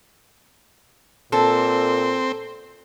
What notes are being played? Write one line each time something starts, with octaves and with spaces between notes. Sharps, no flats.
A#2 C4 A4